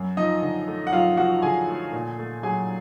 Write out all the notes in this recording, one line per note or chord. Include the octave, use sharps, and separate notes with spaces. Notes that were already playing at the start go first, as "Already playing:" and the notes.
Already playing: F#2
F3 D#4 D#5
D3
A3
F#5
F#2 F4 F5
F3 F#4 F#5
D3 G#4 G#5
A3
A#2
A3
F#3 G#4 G#5